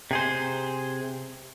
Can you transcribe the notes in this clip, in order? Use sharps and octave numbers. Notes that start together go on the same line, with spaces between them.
C3 G#4 C5